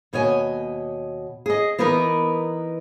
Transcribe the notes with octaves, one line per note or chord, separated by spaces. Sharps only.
D#2 B2 C#5 D#5 G#5
G#4 D#5
E3 B3 D#4 A#4 B4